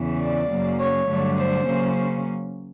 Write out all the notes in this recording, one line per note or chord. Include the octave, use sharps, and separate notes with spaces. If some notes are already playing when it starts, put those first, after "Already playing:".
Already playing: E2 C#3 E3
D5
F#2 C#3 F#3 A#3
C#5
G2 D3 F#3 A3
C5
C#3 F#3 A#3 C#4